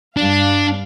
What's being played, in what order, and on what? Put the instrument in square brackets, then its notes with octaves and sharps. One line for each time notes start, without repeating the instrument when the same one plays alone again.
[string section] G2 F5 [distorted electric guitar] D4